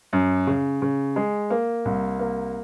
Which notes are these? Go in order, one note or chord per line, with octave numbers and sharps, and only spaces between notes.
F#2
C#3
C#3
G#3
A#3
C2
A#3